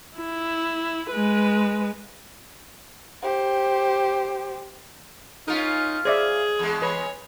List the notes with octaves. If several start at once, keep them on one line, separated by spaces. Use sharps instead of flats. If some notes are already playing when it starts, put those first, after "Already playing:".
E4
G#3 B4
G4 C5
C#4 D#4 F4 A#4
G#4 C5 D5 E5
E2 G#3
B4 C#5